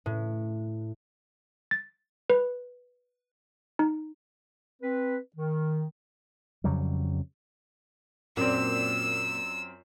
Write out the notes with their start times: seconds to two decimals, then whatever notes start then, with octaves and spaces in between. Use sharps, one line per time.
0.06 A2
1.71 A6
2.30 B4
3.79 D#4
4.82 C4 B4
5.37 D#3
6.64 F2 C#3 F#3 G3
8.37 F#2 A#2 C4 E6